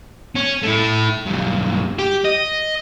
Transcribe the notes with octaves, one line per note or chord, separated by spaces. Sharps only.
C#4
A3 E4
B1 G2
G4
D#5